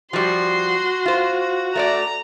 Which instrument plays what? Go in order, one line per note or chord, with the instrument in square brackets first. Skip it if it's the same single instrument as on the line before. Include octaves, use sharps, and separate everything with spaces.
[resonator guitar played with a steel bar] F3 G3 [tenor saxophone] F#4 [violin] C6
[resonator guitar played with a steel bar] F4 C5
[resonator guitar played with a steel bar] A3 C#5 D5 [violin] A#5